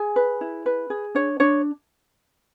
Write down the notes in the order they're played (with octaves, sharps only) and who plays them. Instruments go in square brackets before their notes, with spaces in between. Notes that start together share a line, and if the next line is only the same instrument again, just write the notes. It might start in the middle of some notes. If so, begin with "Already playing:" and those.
Already playing: [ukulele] G#4 G#5
B4
E4
B4
G#4
D4 C#5
D4 C#5